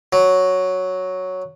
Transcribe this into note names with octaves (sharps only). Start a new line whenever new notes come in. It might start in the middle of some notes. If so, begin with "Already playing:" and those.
F#3